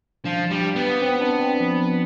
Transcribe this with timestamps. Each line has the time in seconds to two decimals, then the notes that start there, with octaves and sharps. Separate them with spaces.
0.25 F3 D4
0.50 G3
0.76 B3
1.02 C4
1.21 D4
1.40 C4
1.60 F3